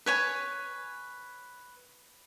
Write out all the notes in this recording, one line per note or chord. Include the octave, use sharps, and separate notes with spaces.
B4 C#5 G#5